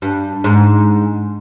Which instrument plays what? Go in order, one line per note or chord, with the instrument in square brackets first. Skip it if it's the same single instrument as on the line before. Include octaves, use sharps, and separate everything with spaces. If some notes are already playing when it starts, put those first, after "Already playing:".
[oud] G2
G#2